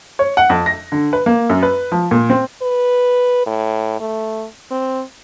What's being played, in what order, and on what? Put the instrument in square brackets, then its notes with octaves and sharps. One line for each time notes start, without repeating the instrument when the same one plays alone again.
[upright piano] C#5
F#5
F2
A#6
D3
B4
A#3
F#2
B4
F3
A#2
C4
[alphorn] B4
A2
A3
C4